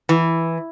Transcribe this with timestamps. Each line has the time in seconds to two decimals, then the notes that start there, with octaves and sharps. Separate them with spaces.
0.09 E3